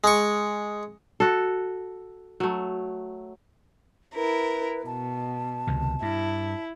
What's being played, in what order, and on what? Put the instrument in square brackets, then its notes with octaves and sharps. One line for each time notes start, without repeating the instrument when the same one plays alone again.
[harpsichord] G#3 C#6
[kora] F#4 A4
F#3 A3
[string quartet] E4 A#4 [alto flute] B4
[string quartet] B2 [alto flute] A5
[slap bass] C#2 C3 D#3
[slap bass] G2 [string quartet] E4